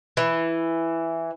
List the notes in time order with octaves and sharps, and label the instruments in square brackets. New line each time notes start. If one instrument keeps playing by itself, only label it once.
[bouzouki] E3